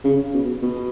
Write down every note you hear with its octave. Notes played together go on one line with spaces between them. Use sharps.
C#3
B2
B2